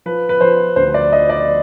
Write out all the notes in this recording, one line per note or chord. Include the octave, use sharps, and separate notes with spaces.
F3 B4
B4
F3 C5
D2 C5
D5
F3 D#5
D5